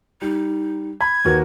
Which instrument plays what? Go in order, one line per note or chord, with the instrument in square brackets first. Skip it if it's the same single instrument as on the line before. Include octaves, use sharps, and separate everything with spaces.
[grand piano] G3 [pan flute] D#4
[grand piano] B5 [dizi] G#6
[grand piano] D#2 F#4 A#4 [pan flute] B4